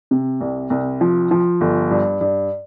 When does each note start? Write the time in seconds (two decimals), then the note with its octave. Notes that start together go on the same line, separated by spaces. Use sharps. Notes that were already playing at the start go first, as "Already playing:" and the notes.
0.11 C3
0.41 C2
0.70 C2
1.01 F3
1.31 F3
1.61 G1
1.91 G2
2.21 G2